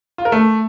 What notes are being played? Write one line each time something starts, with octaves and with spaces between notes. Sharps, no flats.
F4
A#4
A3